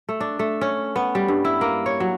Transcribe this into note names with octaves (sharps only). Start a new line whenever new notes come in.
A3
D4
A3
C#4
B3
G3
G2
E4
A#3
C#5
F#3